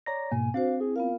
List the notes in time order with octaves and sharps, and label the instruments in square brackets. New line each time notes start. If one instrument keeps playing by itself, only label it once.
[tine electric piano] C#5 A#5 A#6 [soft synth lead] D5
[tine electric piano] G#2 B2 A#3 [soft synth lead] G#5
[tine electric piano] C4 [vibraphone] D4 F#4 C5 [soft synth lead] F5
[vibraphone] E4 [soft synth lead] G#4
[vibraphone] B3 F4 F5 [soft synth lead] A#4